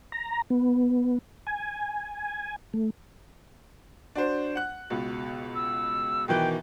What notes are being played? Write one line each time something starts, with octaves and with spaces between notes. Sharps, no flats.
A#5
B3
G#5
A3
D4 F#4 C5
F#5 F#6
C#2 B2
E6
B2 D#3 E3 G5